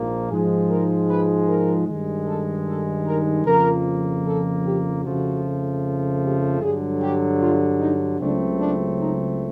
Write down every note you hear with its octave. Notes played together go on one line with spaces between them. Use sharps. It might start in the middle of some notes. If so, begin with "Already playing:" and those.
Already playing: A#1 G#2 F3 A#3
G#2 F3 G#3 G#4
A#4
B4
A#4
G2 D#3 G#3
A4
A4
A#4
F2 C#3 F3 A#3 A#4
A4
G4
F2 C#3 F3 A3 F#4
G4
G2 D3 F#3 G#4
G4
F4
D#4
C#2 C#3 F#3 A3 C4 D4
D4
D#4